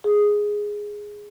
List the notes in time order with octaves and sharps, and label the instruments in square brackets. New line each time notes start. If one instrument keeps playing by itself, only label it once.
[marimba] G#4